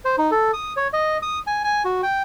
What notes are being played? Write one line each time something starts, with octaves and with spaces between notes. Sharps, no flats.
C5
D#4
A4
D#6
C#5
D#5
D#6
G#5
G#5
F#4
G5